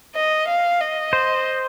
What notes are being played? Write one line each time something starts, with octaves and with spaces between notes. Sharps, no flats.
D#5
F5
D#5
C5